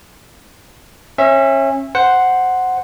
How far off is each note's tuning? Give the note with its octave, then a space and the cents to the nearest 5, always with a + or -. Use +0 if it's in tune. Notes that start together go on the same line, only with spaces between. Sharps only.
C#4 -30 E5 +0
C5 +0 F#5 +0